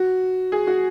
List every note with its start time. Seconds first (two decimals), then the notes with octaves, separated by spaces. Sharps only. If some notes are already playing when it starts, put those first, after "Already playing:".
Already playing: F#4
0.52 G#4
0.67 F#4